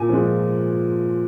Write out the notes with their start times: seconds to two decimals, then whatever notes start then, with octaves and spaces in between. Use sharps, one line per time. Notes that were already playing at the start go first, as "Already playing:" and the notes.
Already playing: A#2 G#5
0.09 F3 G#3